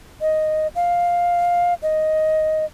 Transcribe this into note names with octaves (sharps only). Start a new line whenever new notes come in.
D#5
F5
D#5